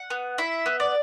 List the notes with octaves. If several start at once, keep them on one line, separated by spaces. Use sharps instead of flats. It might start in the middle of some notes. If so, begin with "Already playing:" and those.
Already playing: F#5
B3
E4 E5
B3
D5